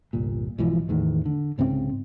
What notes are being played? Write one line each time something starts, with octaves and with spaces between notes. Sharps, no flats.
G1 C2 A#2
B1 G#2 E3 F3
E2 A2 D#3
D3
C2 G#2 C#3 C4